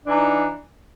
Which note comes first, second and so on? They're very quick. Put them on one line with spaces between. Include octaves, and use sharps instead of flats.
D4 E3 D#4